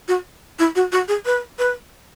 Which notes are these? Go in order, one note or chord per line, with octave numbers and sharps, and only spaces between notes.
F#4
E4
F#4
F#4
G#4
B4
B4